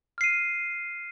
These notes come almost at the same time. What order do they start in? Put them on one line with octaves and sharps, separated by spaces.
F6 C7 D#7